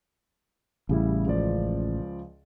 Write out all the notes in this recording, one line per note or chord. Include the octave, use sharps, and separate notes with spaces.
A1 C#3 G3 E4
C#2 F3 D5